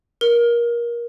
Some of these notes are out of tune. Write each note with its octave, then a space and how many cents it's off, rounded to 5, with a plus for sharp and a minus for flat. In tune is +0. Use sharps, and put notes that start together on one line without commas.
A#4 +25